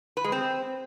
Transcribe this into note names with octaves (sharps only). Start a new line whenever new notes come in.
B4
G#3
C4